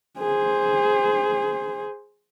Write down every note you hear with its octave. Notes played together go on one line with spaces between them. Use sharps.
G#4 C5